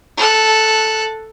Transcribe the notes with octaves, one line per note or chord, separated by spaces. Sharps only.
A4 F#6